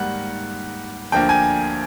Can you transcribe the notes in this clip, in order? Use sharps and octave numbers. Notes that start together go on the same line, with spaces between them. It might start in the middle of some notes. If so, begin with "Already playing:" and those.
Already playing: G#2 D#3 G3 A#3 F#5
D2 D3 F3 A#3 G5
G#5